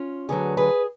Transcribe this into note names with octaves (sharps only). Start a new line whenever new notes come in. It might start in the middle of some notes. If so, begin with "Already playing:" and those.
Already playing: C#4 F4
D2 D3 F#3 G#4 B4
G#4 B4